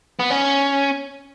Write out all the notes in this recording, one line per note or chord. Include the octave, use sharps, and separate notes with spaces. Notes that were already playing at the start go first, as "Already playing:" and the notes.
B3
C#4